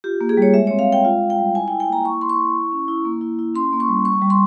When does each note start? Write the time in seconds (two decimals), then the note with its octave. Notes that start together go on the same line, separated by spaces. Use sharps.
0.04 F4 G4
0.21 A#3
0.29 G#4
0.37 G3 C#5
0.54 G#3 E5
0.67 C#5
0.71 C4
0.79 F5
0.88 G#3 G5
1.04 F4 F5
1.22 F4
1.30 G5
1.38 G3
1.54 E4 G#5
1.68 G5
1.72 E4
1.80 G5
1.88 A#3 A#5
2.05 E4 C#6
2.21 E4 C6
2.29 C#6
2.39 E4
2.55 E4
2.72 C#4
2.88 E4
3.05 A#3
3.21 E4
3.39 E4
3.55 C#4 C6
3.72 A#3
3.80 C#6
3.88 G3
4.05 G3 C#6
4.22 G3
4.30 C6